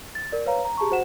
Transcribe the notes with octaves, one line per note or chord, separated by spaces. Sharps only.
A6
A#4 D5
B4 C#5 F5 A#5
A#5
G4 G#4 A5 A#5 C#6
F#4 C5 F#5 E7